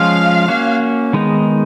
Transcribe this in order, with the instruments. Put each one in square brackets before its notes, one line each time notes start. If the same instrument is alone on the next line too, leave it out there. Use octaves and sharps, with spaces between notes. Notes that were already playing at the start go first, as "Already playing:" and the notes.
Already playing: [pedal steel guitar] F3 G#3 C#4 F4 [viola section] F5
[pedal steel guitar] A#3 C#4 F#4
D#3 G#3 B3 D#4